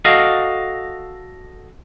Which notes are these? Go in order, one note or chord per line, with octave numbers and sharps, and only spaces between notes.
F#4 A4 D#5 F5